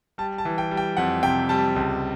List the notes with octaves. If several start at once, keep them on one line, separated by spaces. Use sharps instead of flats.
G3 A5
A5
E3
G5
G3
G5
F2 F#5
C3 G5
G3 A5
C#2